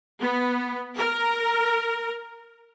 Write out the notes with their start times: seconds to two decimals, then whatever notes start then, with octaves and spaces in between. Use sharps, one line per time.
0.21 B3
0.97 A#4